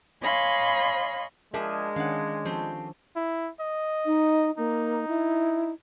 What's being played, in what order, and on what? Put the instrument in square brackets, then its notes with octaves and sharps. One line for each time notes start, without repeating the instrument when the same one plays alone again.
[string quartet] C#5 D#5 F5 G#5 B5 C6
[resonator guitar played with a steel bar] F3 D4 E5 [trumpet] G#3 [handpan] G#4 A#4
[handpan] D#3 C#4 D4 [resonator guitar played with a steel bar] F5 F#5
[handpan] F3 [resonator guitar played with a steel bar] A3 C4 G4
[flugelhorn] E4
D#5
[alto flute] D#4
[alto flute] A#3 [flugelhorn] D#4
[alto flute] E4